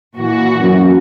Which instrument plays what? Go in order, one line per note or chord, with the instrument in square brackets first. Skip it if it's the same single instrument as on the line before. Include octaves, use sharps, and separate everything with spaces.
[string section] A#2 E3 F#4
[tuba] F#2